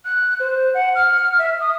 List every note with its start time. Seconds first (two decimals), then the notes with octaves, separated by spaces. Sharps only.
0.05 F#6
0.40 C5
0.74 F#5
0.95 F6
1.38 E5
1.60 D#6